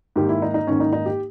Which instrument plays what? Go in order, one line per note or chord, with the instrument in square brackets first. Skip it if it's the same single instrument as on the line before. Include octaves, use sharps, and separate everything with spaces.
[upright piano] G#2 D#3 A#3 G4
E4
D#4
D#4
G#2 D#3 A#3 C#4
D#4
D#4
G4